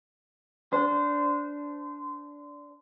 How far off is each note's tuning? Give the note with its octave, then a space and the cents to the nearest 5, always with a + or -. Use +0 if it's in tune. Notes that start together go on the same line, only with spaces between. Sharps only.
D4 -15 C5 -25